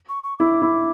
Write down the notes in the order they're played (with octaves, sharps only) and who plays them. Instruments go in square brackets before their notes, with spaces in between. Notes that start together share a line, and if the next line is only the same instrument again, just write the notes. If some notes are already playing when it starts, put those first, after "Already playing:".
[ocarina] C#6
C#6
[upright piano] E4 [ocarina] D6
[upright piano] E4